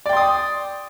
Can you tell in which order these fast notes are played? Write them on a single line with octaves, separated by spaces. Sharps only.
D5 G5 C6 D#6